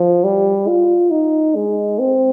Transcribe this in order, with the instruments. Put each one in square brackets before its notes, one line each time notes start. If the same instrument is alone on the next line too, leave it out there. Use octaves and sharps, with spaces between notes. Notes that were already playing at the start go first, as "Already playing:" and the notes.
Already playing: [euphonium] F3
G3
F4
D#4
G#3
C4